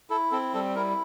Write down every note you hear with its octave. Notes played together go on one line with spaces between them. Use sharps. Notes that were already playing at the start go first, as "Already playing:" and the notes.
E4 A4
C4 A4
G3 A4
E4 A#4